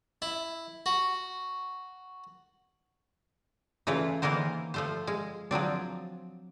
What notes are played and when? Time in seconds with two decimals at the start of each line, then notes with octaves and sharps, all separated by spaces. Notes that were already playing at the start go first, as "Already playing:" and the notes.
0.22 E4
0.86 F#4
3.87 C#3 E3 A3 E4 F4
4.22 D#3 E3 A#3 B3 A#4 C5
4.74 F3 A3 C5
5.07 G#3
5.51 F3 F#3 C4 D4